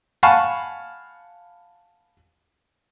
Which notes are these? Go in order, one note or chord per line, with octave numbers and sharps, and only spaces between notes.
F5 F#5 G#5 A5 B5 C#6